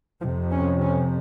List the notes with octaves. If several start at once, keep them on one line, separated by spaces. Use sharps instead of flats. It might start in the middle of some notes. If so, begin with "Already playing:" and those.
F2 C3 F3
C#4
C#4